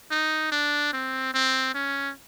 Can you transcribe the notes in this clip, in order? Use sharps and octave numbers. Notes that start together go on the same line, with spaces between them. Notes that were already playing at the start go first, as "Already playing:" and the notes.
D#4
D4
C4
C4
C#4